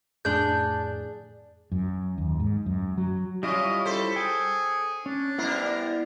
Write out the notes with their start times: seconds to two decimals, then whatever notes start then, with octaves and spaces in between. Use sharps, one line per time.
0.25 F2 A2 D4 G#4 D5 G6
1.72 F#2
2.18 D#2
2.40 G#2
2.66 F#2
2.98 F#3
3.43 G3 C#4 E4 F4 D#5
3.85 A4 C5 B5
4.16 G#4 G5
5.06 C#4 D4
5.38 G3 B3 E4 A#4 C5